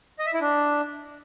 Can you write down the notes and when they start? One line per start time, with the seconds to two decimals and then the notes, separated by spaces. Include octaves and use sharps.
0.19 D#5
0.26 E5
0.34 E4
0.41 D4